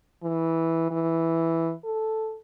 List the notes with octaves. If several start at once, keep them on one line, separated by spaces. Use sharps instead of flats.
E3
E3
A4